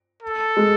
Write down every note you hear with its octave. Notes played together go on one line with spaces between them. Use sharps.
A4
G#3